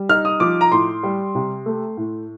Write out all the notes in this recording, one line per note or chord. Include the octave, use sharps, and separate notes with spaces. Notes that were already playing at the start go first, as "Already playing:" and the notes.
Already playing: G3
D#4 F6
D#6
F3 D6
A#5
A2 C6
G3
C3
A3
A2